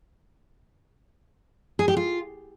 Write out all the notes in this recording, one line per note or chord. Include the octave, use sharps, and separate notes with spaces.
G#4
G4
F4